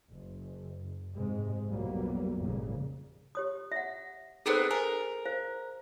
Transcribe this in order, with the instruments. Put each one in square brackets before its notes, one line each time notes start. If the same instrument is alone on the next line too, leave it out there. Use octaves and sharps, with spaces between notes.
[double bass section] F#1
G#2 C3 G#3
B1 F2 F#3 G3 A#3 B3
G#1 F2 A#2 C#3 G3 A#3
[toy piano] G4 C#5 D#6
E5 F#5
[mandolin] B3 C4 D#4 [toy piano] G#4 A4 C5
[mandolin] A#4 [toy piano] G#5
[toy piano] C5 F5